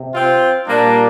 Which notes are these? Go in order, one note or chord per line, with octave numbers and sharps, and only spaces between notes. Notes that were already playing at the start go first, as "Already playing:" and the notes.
Already playing: C3
C4 F4
A#2 G3 A#3 D4